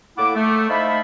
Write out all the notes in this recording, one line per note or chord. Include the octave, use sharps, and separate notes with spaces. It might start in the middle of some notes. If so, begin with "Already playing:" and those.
A2 A#3 E4 F#5 D6
A3
D#4 C5 E5 F5 A5 B5